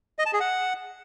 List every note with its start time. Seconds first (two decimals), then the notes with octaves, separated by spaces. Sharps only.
0.19 D#5
0.26 A5
0.33 G#4
0.40 F#5